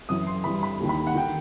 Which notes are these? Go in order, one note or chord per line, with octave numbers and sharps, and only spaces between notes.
F#2 E3 D#6
C6
G2 E3 B5
B5
D#2 D#3
B5
F#5
D#3 G5